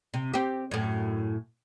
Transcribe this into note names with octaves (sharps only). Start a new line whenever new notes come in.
C3
C4 G4
F#2 A2